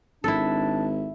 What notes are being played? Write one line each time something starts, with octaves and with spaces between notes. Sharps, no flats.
G#1 D4 E4 A4